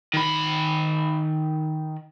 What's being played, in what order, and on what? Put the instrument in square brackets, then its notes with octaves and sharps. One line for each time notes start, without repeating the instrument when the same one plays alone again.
[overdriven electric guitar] D#3 B5